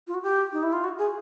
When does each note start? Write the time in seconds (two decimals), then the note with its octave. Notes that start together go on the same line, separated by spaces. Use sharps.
0.07 F4
0.14 F#4
0.23 G4
0.52 D#4
0.63 E4
0.72 F4
0.84 F#4
0.98 G#4